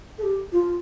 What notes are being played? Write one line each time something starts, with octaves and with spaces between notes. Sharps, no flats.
A4
G4
F4